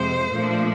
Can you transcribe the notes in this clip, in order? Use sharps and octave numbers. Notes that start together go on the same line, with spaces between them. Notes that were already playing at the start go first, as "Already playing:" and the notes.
Already playing: F2 C3 F3 G#3 C5
A#2 F3 A3 D4